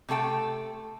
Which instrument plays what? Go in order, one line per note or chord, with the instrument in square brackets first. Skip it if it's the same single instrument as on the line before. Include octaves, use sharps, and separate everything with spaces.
[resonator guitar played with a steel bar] C3 A3 A4 G5